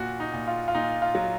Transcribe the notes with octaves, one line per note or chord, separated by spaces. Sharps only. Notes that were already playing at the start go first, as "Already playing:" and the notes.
Already playing: A#2 F#4
D#4
A#2
F4
F4
A#2 D#4
F4
F#3